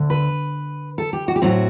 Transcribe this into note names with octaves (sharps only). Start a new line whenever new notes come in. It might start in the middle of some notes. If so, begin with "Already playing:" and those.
Already playing: D2 D3
B4
A4
G4
F#4
G4
A2 F#3 C4 F#4